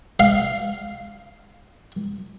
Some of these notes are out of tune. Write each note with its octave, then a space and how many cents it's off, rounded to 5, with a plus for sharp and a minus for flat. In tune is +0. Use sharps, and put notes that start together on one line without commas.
F5 +0